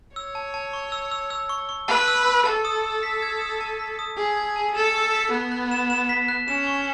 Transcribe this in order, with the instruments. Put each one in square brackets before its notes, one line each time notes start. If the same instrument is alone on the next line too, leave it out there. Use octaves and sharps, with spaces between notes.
[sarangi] C#5 [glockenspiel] E6
[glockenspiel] A5
A5
C#6
E6
E6
E6
C#6
C#6
[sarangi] B4 [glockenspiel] A5
[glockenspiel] E6
E6
[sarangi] A4 [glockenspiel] A5
[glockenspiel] D#6
D#6
B6
G#6
D#6
A5
B6
D#6
[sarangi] G#4 [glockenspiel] A5
[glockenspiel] G#6
A5
[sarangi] A4 [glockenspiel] E7
[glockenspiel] C#6
B6
[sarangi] B3 [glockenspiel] F#6
[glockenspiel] F#6
E7
E7
B6
F#6
[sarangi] C#4 [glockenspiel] E7
[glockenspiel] C#6